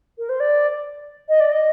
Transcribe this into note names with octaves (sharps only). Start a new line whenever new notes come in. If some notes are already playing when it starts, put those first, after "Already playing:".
A#4
C5
D5
D#5
D5
D#5